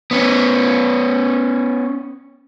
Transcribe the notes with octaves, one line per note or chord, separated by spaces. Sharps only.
B3 C#4